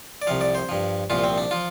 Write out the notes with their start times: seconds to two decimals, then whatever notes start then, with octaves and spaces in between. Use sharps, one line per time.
0.22 D5
0.27 C2 C3 F3 F5
0.41 D5
0.55 C5
0.69 G2 F3
1.10 C2 A#2 F3 F4
1.24 C4
1.38 D4
1.51 F3 F4